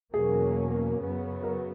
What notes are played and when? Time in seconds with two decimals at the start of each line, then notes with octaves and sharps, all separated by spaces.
0.14 E2 B2 F#3 A#3 C#4 G#4
1.00 F#2 C#3 F#3 B3
1.44 A#4